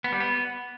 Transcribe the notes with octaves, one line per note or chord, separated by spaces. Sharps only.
B3
G3
B3